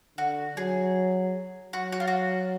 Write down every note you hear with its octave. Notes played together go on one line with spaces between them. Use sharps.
D3 F#4
F#3 G#4
F#3 F#4
F#4
F4
F#4